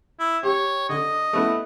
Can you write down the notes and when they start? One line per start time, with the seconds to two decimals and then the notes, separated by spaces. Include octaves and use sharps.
0.19 E4
0.43 G4 C#5
0.89 D3 D#5
1.33 A3 B3 E4